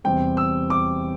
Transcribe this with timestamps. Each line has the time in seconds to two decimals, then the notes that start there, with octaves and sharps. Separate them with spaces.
0.04 E2 C3 G3 C4 G5
0.37 E6
0.70 D6